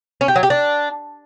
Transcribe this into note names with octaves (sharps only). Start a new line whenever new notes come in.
C#4
G4
F#3
G4
D4